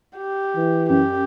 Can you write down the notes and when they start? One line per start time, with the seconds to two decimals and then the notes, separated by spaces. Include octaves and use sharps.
0.17 G4
0.56 E3
0.89 F#2 G4